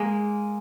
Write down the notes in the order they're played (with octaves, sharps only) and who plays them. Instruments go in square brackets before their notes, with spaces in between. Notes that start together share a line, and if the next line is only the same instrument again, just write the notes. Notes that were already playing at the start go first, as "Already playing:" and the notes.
Already playing: [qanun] G#3 A#3